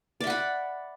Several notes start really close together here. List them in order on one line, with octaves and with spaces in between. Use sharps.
D5 E5 F#5 B5